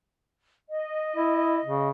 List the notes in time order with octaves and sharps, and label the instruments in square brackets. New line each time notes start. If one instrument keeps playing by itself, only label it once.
[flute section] D#5
[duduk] E4
C#3